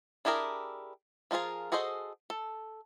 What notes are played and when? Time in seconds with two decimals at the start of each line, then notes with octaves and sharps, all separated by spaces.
0.25 D4 E4 G4 G#4 A#4
1.31 F3 D#4 F4 G#4 A#4
1.72 F#4 G#4 A4 C5 D#5
2.30 A4